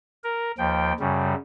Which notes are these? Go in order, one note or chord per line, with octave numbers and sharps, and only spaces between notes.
A#4
D#2 F3 G5
F#2 C#3 G3